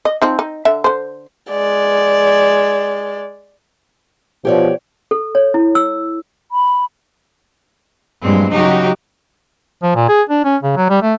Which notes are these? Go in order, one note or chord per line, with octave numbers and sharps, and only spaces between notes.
D#5
F3 C4 D#4
D#4
D3 E5
D3 C5
G#3 D5
B2 F3 G4 C#5 D5
A4
C#5
E4
E6
B5
G2 A#2 F#3 G#3 C4
C#3 F#3 D#4 F#4 G4
F3
A#2
G#4
D4
C#4
C#3
F#3
G3
A3